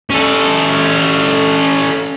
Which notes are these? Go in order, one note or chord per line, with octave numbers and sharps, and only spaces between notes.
C#4 A4